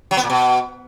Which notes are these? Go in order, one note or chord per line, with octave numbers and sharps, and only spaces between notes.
F#3
B3
A#2
B2